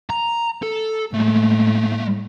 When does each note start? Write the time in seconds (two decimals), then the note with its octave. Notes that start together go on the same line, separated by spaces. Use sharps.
0.10 A#5
0.63 A4
1.14 A2 G#3 A3